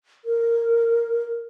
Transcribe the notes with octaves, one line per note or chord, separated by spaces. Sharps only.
A#4